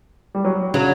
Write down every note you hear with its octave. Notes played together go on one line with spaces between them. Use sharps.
G3
F#3
C#3 F#3